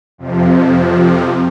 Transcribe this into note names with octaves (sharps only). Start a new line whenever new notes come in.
F2 C3 F3